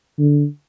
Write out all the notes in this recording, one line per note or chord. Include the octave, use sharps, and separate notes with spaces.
D3